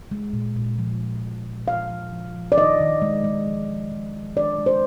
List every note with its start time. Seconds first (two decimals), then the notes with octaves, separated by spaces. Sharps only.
0.11 G#3
0.33 A#2
0.56 A#2
0.79 F3
1.01 F3
1.23 A#2
1.46 A#2
1.68 F3 F5
1.90 F3
2.12 F3
2.35 F3
2.52 D5
2.57 D#3 D#5
2.80 D#3
3.02 G#3
3.24 G#3
3.47 F3
3.69 F3
3.92 F3
4.14 F3
4.36 D#3 D5
4.58 G#3
4.66 C5